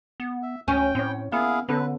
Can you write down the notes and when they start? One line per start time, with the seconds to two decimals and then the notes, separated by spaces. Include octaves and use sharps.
0.20 B3
0.43 E5
0.68 D2 C#4 G5
0.95 A2 C4 C#5
1.32 A#3 B3 E4 G#4 F5
1.69 D3 B3 C#4 A4 B4